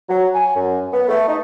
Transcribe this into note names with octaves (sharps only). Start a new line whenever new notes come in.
F#3
G#5
F#2
B3
A3
D#4